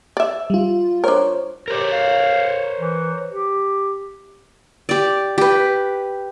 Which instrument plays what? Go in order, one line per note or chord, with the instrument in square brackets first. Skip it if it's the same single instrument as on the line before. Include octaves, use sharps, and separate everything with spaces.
[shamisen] D5 E5
[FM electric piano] G3 F4
[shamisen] D4 A#4 [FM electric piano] C5 C#5
[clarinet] G4 [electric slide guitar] A#4 C5 C#5
[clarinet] F5
E3
G4
[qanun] G4 D5
G4 B4